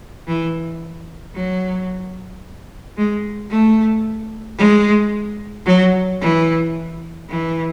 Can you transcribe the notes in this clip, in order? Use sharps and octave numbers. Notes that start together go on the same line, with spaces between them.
E3
F#3
G#3
A3
G#3
F#3
E3
E3